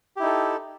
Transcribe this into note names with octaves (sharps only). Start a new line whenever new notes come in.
D#4 E4 G4 A4